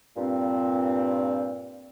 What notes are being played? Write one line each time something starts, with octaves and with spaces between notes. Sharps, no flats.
G2 A#2 C4